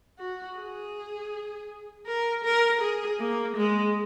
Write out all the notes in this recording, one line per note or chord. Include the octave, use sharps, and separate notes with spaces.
F#4
G#4
A#4
A#4
G#4
A#3
G#3